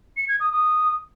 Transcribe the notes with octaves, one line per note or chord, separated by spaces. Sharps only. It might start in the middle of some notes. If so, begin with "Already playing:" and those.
C#7
G#6
D#6
D#6